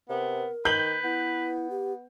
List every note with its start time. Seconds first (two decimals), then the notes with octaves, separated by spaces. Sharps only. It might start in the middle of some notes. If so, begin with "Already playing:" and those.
0.09 C3 B3 A#4
0.65 D#3 B4 G6 F#7
1.04 B3 E4
1.70 G4